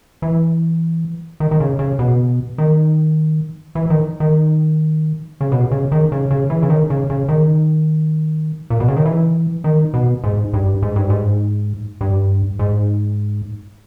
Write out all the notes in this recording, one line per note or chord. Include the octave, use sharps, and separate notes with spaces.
E3
D#3
D#3
C#3
C#3
B2
D#3
E3
D#3
D#3
C#3
B2
C#3
D#3
C#3
C#3
E3
C#3
D#3
C#3
C#3
D#3
A#2
B2
C#3
D#3
E3
D#3
B2
G#2
G2
G#2
G2
G#2
G2
G#2